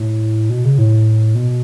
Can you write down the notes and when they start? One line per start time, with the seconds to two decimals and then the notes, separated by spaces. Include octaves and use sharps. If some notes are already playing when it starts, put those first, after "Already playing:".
Already playing: A2
0.50 B2
0.65 C#3
0.78 A2
1.35 B2